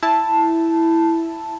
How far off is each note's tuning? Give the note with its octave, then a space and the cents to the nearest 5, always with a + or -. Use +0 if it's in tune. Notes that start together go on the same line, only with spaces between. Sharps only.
E4 +0 A5 +0